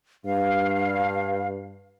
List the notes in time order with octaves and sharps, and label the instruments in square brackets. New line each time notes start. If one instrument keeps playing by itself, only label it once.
[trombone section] G2 [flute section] F5